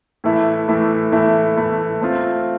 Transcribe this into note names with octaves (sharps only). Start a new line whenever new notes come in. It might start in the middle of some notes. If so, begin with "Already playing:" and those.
A2 E3 A3 E4
A2 E3 A3 E4
A2 E3 A3 E4
A2 E3 A3 E4
A3 C4 F4